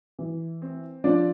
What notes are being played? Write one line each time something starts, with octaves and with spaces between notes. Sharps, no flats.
E3
C4
F3 D4 D5